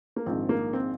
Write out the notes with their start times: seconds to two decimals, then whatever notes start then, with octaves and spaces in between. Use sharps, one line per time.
0.16 A#3
0.26 A#1 G#2 D#3 C4
0.49 A#3
0.73 C4